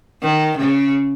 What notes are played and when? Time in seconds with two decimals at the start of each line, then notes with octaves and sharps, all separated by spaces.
0.22 D#3
0.58 C#3